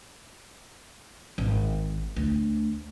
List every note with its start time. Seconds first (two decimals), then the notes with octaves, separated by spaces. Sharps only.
1.38 G#1
2.16 D2